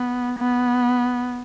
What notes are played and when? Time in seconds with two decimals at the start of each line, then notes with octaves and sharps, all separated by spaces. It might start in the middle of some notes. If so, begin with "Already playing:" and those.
Already playing: B3
0.39 B3